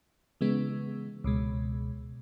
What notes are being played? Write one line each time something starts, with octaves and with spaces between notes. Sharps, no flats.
C#3 E3 G#3 B3
C#2 B2 G#3